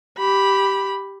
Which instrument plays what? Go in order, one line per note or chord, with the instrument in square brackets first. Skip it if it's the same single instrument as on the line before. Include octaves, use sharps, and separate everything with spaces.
[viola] G4 B5